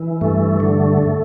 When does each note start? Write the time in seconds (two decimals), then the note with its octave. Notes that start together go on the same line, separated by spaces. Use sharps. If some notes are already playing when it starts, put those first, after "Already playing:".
Already playing: E3
0.21 G2 A3
0.60 D3